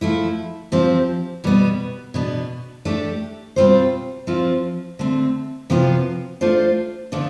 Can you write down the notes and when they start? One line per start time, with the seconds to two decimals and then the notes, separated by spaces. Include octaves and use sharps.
0.01 F3 A3 E4
0.72 F3 C4 G4
1.44 B2 G3 B3
2.14 B2 B3 D4
2.85 A3 D4 G4
3.56 B2 G3 C4 F4 C5
4.27 F3 C4 F4
4.99 D3 A3 C4
5.70 C3 F3 B3 F4 C5
6.41 A3 D4 F4 C5
7.12 D3 F3 B3 D4